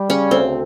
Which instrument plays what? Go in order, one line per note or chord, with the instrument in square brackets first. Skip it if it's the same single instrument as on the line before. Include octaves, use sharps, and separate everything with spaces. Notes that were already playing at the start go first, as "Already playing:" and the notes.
Already playing: [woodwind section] G3
[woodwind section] C#3 [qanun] C#4
[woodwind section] D2 [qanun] C4